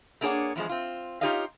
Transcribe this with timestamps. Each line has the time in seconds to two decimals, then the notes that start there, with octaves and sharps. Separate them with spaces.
0.21 A3 A#3 D4 G#4 C#5 F#5
0.56 E2 F3 G#3
0.69 C4 F4
1.21 D#4 F4 G4 C#5 D#5 F5